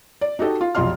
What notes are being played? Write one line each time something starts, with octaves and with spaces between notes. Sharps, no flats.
D5
D#4 F#4 G4 A4 D#5
F4
F1 B1 F4 D#5 C6 F6